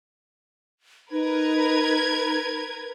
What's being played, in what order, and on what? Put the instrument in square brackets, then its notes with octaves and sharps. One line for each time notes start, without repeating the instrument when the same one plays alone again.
[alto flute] D#4 [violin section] A#4 B4 G#6